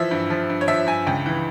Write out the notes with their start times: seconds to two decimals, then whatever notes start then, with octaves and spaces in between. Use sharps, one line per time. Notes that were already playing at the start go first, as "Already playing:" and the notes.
Already playing: E3 F3 E5
0.11 G2
0.30 F3
0.49 G2
0.61 C#5
0.68 F3 E5
0.86 G2 G#5
1.07 C#2 G5
1.26 E3